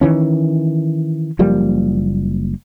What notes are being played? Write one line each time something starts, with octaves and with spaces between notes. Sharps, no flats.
D#3 E3 C#4
F#1 F3 G3 A#3